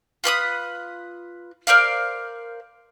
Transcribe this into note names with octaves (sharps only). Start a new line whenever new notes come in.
F4 B4 B5 D#6
A#4 C5 D5 F5